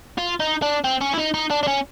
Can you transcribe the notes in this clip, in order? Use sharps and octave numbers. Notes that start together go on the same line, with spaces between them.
F4
D#4
D4
C4
C#4
E4
D#4
D#4
D4
D4
C#4